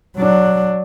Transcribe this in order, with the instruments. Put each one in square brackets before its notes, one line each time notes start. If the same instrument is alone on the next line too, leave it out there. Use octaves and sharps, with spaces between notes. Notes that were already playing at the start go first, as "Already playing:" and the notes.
[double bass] F#3 D4